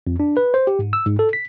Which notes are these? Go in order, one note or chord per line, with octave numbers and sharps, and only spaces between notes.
F2
D4
B4
C5
G4
G#2
E6
G#2
A4
B6